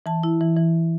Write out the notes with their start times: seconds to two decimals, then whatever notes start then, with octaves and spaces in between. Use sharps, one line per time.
0.06 E3 A5
0.23 E4
0.41 E3
0.57 E3